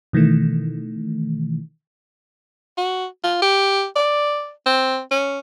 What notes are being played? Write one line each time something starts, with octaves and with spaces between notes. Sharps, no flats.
B2 D#3 E3 A3
F#4
F4
G4
D5
C4
C#4